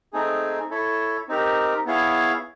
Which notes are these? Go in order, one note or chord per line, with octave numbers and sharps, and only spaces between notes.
A3 C4 D#4 G#4
E4 A4 C#5
C4 D#4 G4 A#4
B3 E4 G#4 C#5 F5